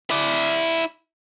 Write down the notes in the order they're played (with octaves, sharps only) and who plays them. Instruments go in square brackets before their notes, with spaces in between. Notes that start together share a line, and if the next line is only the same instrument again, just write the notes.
[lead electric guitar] E4 D5